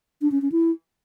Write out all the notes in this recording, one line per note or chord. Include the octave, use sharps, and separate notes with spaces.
D4
C#4
C#4
E4